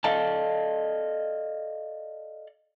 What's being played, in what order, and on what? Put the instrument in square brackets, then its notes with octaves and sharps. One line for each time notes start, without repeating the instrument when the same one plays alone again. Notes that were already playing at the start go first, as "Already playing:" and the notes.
[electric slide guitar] A4 D5 D#5 F5 A5